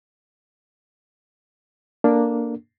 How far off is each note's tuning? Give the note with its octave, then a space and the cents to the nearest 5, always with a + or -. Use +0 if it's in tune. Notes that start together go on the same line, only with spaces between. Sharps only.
A#3 +0 D4 +0 A4 +0